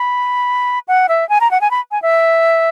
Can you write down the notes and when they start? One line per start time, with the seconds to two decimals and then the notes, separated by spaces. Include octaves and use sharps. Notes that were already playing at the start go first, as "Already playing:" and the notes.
Already playing: B5
0.88 F#5
1.09 E5
1.29 G#5
1.41 A#5
1.51 F#5
1.61 G#5
1.71 B5
1.91 G#5
2.02 E5